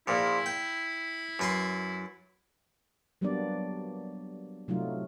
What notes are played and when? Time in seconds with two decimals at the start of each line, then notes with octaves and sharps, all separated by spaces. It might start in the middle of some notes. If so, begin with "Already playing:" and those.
0.07 A#1 A#2 E4
0.46 G5
1.39 F#2 B4 C6
3.21 F#3 G3 A#3 B3 D4 D5
4.68 C3 F#3 A3 D#4 F4